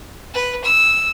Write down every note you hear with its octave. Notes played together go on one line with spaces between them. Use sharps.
B4
E6